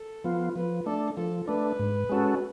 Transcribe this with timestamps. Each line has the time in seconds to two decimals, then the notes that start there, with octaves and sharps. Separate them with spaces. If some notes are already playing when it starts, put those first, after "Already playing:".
Already playing: A4
0.24 F3 B3 F4
0.56 F3 B4
0.86 A3 D4 A4
1.17 F3 A4
1.48 A3 D4 B4
1.80 G#2
2.09 G#3 C#4 F#4 A4